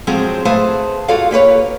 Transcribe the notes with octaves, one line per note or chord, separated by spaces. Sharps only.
F3 F#3 G#3 C4 G#4
A3 G#4 B4 C5 F5 A5
F4 F#4 G#4 A4 D5 F5
A#3 G4 B4 C#5